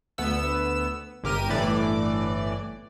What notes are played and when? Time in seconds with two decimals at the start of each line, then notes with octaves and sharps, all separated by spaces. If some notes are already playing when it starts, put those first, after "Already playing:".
0.18 D2 B3 E6
1.23 G1 G4 A#4 D#7
1.49 G1 A2 E3 D5